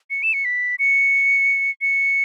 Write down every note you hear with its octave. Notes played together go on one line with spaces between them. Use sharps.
C#7
E7
C#7
B6
C#7
C#7